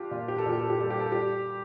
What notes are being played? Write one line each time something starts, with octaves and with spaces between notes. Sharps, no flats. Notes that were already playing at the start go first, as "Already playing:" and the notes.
Already playing: D4 F4 G4
A#2 F4
G4
A4
A#2 G4
A4
G4
G3 A4
G4
A4
G3 G4